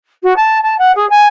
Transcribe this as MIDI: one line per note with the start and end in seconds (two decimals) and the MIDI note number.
0.23 0.36 66
0.36 0.58 81
0.63 0.77 81
0.78 0.91 78
0.95 1.08 68
1.09 1.27 80